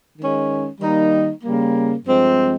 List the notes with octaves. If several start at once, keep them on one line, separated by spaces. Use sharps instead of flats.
D#3 G#3 C#4
D#3 G3 A#3 D#4
C#3 G3 A#3
G2 F3 G#3 C4